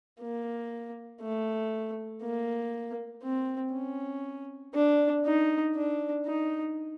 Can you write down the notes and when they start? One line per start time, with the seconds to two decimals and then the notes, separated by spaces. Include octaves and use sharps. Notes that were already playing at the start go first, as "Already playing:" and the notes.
0.20 A#3
1.21 A3
2.22 A#3
3.23 C4
3.73 C#4
4.74 D4
5.25 D#4
5.75 D4
6.26 D#4